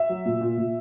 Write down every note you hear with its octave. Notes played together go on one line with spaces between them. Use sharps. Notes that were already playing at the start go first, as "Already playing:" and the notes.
Already playing: E5
F#3
A#2
A#2
A#2